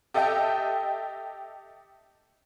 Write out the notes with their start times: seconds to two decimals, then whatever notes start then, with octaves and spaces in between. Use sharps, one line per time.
0.14 G4 A4 D#5 E5 G5